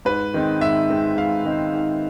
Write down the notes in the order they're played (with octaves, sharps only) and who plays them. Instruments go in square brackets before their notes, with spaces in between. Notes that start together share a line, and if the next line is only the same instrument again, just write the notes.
[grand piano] G#2 B4
D#3 G#3 C4 D#4
G#2 E5
D#3 G#3 C4 D#4
G#2 F5
D#3 G#3 C4 D#4
G#2